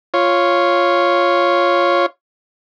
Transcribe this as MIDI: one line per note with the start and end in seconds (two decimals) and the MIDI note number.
0.14 2.06 65
0.14 2.06 73